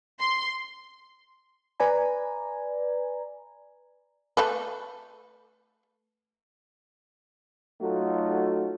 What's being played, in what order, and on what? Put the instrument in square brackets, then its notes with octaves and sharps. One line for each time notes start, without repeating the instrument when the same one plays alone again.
[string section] C6
[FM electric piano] B4 D5 G#5 A#5
[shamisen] A3 A4 B4
[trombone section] F#3 A3 D#4 F4 F#4 A4